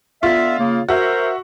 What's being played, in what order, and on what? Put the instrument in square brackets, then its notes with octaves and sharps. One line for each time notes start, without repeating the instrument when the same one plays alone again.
[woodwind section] D3 B3 E5 [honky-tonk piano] F4
[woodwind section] C#3 A#3
[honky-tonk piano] F#4 E5 [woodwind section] A#4 C5